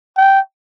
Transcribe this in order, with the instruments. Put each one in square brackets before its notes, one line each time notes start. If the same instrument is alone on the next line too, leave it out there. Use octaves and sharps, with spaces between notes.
[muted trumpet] G5